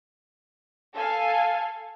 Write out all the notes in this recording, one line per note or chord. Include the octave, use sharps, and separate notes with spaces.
A4 F5 G#5